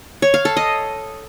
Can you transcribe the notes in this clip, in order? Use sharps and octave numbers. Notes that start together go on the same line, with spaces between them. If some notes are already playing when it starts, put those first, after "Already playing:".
C#5
F5
A4
D#5